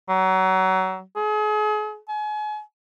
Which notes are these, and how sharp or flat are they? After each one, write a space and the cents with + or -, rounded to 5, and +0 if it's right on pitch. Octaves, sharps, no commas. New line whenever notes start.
F#3 +25
G#4 +40
G#5 +35